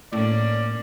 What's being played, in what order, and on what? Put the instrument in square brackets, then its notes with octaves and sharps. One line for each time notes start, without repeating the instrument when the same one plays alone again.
[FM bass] A2 [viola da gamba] A#3 C#4 D4 [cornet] D5